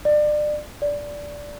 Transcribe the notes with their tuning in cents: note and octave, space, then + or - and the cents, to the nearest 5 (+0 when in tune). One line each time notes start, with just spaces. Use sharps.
D5 +30
D5 -10